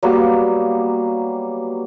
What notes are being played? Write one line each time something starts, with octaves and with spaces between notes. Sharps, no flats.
F#3 G3 A#3 B3